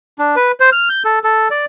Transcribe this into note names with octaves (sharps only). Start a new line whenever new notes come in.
D4
B4
C5
F6
G6
A4
A4
D5